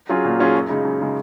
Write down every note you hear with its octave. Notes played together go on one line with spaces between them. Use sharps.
F#3 C#4 F4 G#4
A#2
F#3 C#4 F4 G#4
F#2
C#3 G#3 D#4
F#2
C#3 G#3 D#4